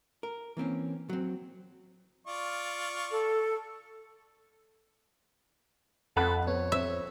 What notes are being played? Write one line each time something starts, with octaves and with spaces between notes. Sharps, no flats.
A#4
E3 A#3 C4 C#4
F#3 C4
F4 D5 C#6
A4
F2 A4 F#5 B5 F#6
B3 C#5
C4 E5